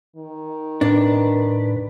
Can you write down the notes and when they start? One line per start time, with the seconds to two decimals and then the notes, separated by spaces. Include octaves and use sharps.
0.16 D#3
0.81 A2 D4 B4